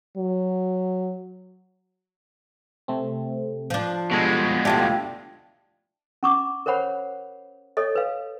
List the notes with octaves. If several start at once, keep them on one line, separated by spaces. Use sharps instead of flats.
F#3
C3 A3 C4
F3 D4
B2 G3 G#3 A4
D2 D4 E4 F4 G4 A4
C#4 C#6 D6
A#4 C5 C#5 F#5 B5
A4 C#5 D#5
B4 F5